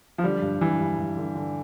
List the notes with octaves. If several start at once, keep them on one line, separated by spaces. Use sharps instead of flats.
F3
D3 G3
G2
G2 E3
G2
G2
D3
D3